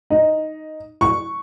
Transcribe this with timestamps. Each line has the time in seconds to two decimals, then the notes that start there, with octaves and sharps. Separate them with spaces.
0.10 D#4
1.01 C#6